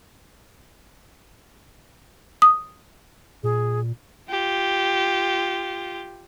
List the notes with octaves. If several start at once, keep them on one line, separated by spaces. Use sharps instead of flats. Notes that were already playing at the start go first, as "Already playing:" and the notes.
D#6
A#2 G#4
F4 G4